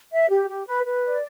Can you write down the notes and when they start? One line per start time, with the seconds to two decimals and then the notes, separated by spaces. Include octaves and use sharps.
0.12 E5
0.29 G4
0.48 G4
0.67 B4
0.85 B4
1.04 D5